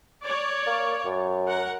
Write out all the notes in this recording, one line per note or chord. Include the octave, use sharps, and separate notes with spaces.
C#5 D5
A#3
F#2
A#4 F#5